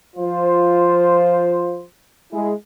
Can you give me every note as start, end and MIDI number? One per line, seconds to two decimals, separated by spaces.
0.16 1.85 53
0.16 1.85 65
0.16 1.85 72
2.32 2.52 56
2.32 2.52 64
2.32 2.52 68